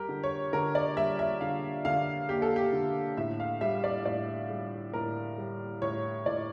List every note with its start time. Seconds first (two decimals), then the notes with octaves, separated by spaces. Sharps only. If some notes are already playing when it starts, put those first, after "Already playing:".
Already playing: G3 G4 A#4
0.09 D3
0.23 C#5
0.53 D3 A#4
0.75 D5
0.97 G3 E5
1.19 E5
1.41 D3 F5
1.85 D3 F5
2.29 A#3 G4
2.42 A4
2.56 G4
2.73 D3
3.17 A2 E5
3.40 F5
3.61 G3 E5
3.84 D5
4.05 A2 D5
4.50 G3
4.93 A2 A#4
5.38 G3
5.82 A2 C#5
6.26 A2 D5